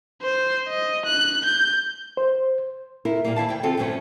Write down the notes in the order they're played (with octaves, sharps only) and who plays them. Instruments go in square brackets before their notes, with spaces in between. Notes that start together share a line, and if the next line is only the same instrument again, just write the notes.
[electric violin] C5
D#5
F#6
G6
[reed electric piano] C5
[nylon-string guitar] E4 F4 A#4
A#2 G3 A#3
E3 E4 F5 A5
D2 G5
D3 C4 F4 F#4 G#4 A4
D2 G2 F3 A3 C#4